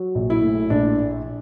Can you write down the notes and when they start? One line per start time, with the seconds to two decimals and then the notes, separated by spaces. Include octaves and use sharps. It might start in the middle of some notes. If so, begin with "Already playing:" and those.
Already playing: F#3
0.15 A#1
0.30 E4
0.42 A2
0.70 A#1 D4